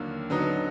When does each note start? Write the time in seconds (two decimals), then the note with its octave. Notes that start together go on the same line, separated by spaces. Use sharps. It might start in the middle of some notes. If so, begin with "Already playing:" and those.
Already playing: D#2 D3 F#3 A#3
0.30 D3 F#3 B3 D#4